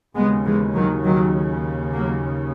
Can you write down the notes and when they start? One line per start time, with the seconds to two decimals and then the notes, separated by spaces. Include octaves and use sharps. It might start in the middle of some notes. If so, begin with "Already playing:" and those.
0.16 D#2 C#3 G#3 B3
0.46 E3 G#3
0.75 D#3 F#3
1.04 D#3 F#3
1.93 F#3 A#3